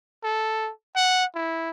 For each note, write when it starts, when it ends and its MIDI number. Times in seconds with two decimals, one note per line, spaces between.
0.23 0.70 69
0.96 1.25 78
1.35 1.71 64